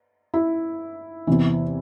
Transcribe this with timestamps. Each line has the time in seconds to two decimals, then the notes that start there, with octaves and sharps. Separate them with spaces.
0.34 E4
1.27 E2 C3 E3